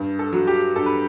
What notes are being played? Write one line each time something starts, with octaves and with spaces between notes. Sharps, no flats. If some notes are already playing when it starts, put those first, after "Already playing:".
Already playing: G2
A4
F#3
G4
G2 A4
B4